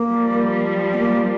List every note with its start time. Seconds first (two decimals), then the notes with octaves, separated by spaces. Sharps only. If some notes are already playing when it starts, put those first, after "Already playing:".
Already playing: A#3
0.08 F3 G3
0.93 B3
0.98 A#3